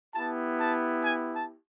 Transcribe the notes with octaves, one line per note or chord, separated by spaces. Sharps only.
B3 E4 G4 A5
A5
G#5
A5